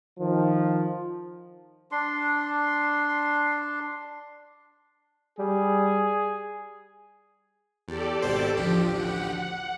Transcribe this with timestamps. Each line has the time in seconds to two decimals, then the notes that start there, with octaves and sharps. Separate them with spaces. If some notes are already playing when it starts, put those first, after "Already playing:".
0.18 D#3 F3
1.91 D4 C6
5.39 G3 G#4
7.88 E2 G4 A4 D5
8.22 G#1 B2 C5
8.57 A1 D2 F3 G4
8.95 F#5